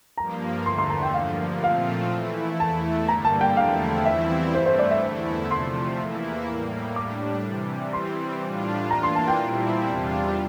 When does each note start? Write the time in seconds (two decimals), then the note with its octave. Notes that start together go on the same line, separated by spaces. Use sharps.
0.18 G2 F3 A#3 A#5
0.66 E2 D3 A3 C6
0.78 C6
0.90 A#5
1.03 G5
1.14 G2 D3 F3 A#3 F5
1.63 A#2 F3 A3 C4 F4 F5
2.12 E3 A3 E4
2.60 E2 E3 A3 E4 A5
3.08 G2 D3 G3 A#3 A#5
3.25 A5
3.41 G5
3.57 E2 D3 F3 A3 E4 F5
4.05 E2 E3 G3 C4 E4 E5
4.54 G2 E3 A3 C5
4.66 C5
4.79 D5
4.91 E5
5.03 E2 D3 A3 E4
5.51 C3 F3 A3 C6
5.99 E2 E3 A#3 E4
6.48 A2 G3 A#3
6.96 A2 G3 D4 D6
7.45 C3 E3 G3
7.93 E3 G3 C4 C6
8.41 A2 G3 D4 F4
8.90 E3 A#3 D4 F4 A#5
9.03 C6
9.15 A5
9.27 G5
9.40 A#2 G3 C4 E4
9.87 E2 C3 G3 D4 F4